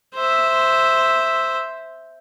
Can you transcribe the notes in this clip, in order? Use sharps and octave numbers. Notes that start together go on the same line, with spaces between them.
C5 E5